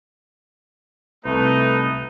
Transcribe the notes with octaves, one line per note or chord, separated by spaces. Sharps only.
C2 A3 D#4 B4